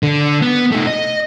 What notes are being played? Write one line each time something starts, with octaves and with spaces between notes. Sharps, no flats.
D3
B3
A3 D#4
D#5